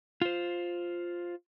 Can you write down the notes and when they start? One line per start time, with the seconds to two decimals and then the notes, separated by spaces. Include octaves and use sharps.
0.22 F4 C5